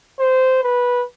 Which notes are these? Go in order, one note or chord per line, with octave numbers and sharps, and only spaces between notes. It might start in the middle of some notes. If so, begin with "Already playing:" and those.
C5
B4